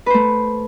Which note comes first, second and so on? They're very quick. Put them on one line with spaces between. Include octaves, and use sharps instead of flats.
B4 C5 A3